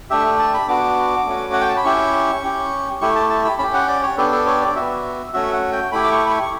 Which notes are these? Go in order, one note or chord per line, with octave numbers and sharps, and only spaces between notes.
A3 D4 G4 E5
A5
B5
B3 D4 F#4 D6
A3 C#4 F#4
F#5
G5
A5
B5
C#4 E4 G4 C#6
C#4 G4
A3 E4 G4 C#6
A5
A5
B5
C#4 G4 B5
F#5
D5
C#5
B3 D4 G4 A4
A4
C#5
D5
B3 F#4 E5
A3 C#4 F#4 E5
F#5
G5
A3 E4 G4 B5
D6
C#6
B5
C#6
C#6